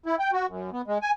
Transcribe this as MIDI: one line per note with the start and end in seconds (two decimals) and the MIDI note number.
0.06 0.16 64
0.19 0.31 79
0.33 0.47 66
0.48 0.70 42
0.73 0.82 59
0.87 0.98 56
1.02 1.11 80